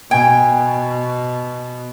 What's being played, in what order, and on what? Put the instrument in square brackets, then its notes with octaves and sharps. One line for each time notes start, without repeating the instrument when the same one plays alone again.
[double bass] B2 [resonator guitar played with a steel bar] G5 [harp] G#5